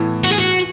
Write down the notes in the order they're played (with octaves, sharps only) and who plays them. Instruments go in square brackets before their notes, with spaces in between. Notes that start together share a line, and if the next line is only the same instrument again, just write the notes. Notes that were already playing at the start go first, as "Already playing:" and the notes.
Already playing: [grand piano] A2 E3 B3
[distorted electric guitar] F#4
G#4
F#4